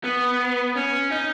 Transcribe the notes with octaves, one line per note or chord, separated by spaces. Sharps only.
B3
C#4
D#4